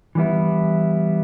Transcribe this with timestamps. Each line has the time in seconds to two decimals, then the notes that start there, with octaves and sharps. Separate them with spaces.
0.15 E3 G3 B3 E4